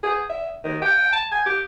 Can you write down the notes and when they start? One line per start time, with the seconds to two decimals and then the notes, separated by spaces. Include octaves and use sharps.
0.03 G#4
0.30 E5
0.64 D#3
0.82 G5
1.13 A5
1.32 G#5
1.46 G4